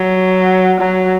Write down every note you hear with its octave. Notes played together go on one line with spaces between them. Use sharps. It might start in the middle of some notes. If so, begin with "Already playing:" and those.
Already playing: F#3
F#3